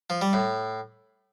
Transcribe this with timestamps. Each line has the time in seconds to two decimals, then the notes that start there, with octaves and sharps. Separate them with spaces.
0.10 F3
0.21 G3
0.33 A2